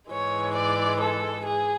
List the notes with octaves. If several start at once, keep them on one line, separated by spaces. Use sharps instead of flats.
G#2 E3 G#3 C#5
D5
A4
G#4